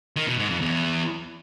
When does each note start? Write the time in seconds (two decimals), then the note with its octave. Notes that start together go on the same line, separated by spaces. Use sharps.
0.16 D#3
0.28 B2
0.39 G#2
0.50 F2
0.61 E2